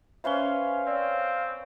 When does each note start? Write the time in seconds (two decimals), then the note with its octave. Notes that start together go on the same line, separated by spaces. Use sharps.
0.24 C#4 B4 C5 E5 F5 G7
0.87 C4 C#5 D5